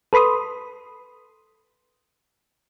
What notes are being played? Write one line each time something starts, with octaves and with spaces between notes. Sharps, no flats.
A4 B4 B5 C6 D#6